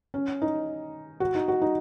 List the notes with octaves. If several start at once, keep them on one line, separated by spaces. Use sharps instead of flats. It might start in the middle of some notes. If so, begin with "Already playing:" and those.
C#4
D#4
F#4
D#4
F#4
D#4